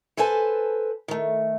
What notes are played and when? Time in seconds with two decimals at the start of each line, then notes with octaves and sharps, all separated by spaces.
0.17 A4 B4 C5 G#5 A5
1.08 D#3 A3